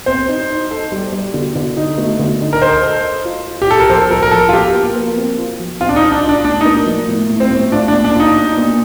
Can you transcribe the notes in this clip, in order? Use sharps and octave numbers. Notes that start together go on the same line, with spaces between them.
C4 C5
D#4
D#4
A4
G3
G3
D3
D3
D#4
A3
D3
D#4
A#4
C5 D#5
A4
D#5
F4
F4
G4
F4 A4
A#4
F3 C5
A4
F3 A#4
A#4
F3 A4
F4
F3 G4
A#3
A#3
C4
F4
F3
C4 F4
D4
D#4
F4
D4
F4
D4
A2 D4
D#4
A#3
F3
A2
A2
C4
A2
D4 F4
D4
A#2
D4
D#4 F4
D4
A#2